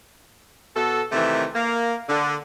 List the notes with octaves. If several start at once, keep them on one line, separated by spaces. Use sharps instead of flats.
B2 F#4 A4
C3 D#3 E3 A3
A#3
D3